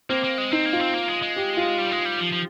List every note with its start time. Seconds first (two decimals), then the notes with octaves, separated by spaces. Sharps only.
0.09 A#3 C4
0.24 A#3
0.38 G#3
0.52 C4 D#4
0.66 A#3
0.73 F4
0.80 C4
0.94 A#3
1.08 G#3
1.22 G#3
1.36 G4
1.57 F4
1.78 G3
1.92 G#3
2.05 G3
2.20 F3
2.33 F3